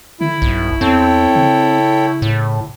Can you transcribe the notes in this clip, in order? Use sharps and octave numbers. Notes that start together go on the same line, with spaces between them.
D3 E4
B1 G2
E2 C4 A4 C#5 G5
C#3
A2